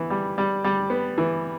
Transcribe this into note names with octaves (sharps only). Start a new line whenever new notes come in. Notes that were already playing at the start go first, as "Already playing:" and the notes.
Already playing: E3 B3
G3
G3
G3
B3
E3